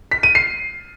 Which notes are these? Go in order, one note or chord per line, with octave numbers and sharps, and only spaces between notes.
B6
D#7
C7